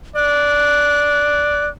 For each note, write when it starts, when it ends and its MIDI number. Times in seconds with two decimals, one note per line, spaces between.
0.16 1.71 74
0.16 1.69 90